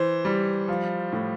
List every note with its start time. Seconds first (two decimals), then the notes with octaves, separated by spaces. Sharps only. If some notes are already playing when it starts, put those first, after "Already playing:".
Already playing: E3 C5
0.25 G3
0.68 F3
1.12 A2